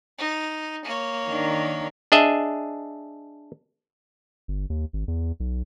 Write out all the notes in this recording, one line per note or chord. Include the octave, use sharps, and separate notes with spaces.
D#4
A#3 C#5
D#3 D4
D4 G#4 D#5 E5
G1
D#2
G#1
E2
B1